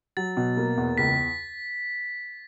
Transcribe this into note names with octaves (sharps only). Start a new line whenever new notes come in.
F#3 A6
B2
A#3
E2
C#2 B6